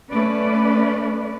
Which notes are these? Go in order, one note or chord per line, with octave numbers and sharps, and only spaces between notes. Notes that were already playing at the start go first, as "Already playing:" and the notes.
A3 C#4 B4 D5